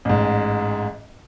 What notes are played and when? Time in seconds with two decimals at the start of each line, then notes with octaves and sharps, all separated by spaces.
0.05 A1 G#2